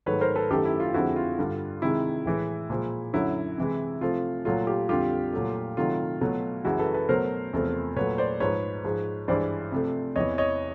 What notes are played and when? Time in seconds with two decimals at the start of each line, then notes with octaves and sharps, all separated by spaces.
0.06 G#2 D#3 F#3 A3 B4 C#5
0.21 A#4 C5
0.36 A4 B4
0.50 F#2 D#3 F#3 A3 G4 A4
0.65 E4
0.80 F4
0.94 F2 D3 F3 G#3 E4 F#4
1.16 F4
1.39 G2 D3 G3
1.82 C3 D#3 G#3 E4
2.26 A2 E3 G#3
2.70 A#2 F3 G#3
3.13 F#2 D3 F#3 E4
3.58 C3 E3 G#3
4.01 C3 F3 A3 F4
4.45 A#2 F#3 A3 F4
4.67 F4 G4
4.89 F2 D3 G3 F4 G4
5.33 A#2 F#3 A3
5.77 C3 D#3 F#3 A3 F4
6.21 B2 F#3 A3
6.64 F#2 C#3 E3 G#3 E4 F#4
6.79 A4 B4
6.94 A4 B4
7.09 B2 F#3 A3 A#4 C5
7.53 E2 C3 F3 A3
7.96 A#2 F#3 A3 B4 C#5
8.18 C5 D5
8.40 G#2 F3 G#3 B4 C#5
8.84 G#2 F3 G#3
9.28 G2 E3 G#3 C5 D5
9.72 C3 F3 A3
10.16 E2 C3 E3 C#5 D#5
10.38 C#5 D#5